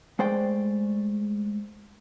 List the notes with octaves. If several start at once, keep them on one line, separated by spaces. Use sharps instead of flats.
G#3 A3 C5 D5 G5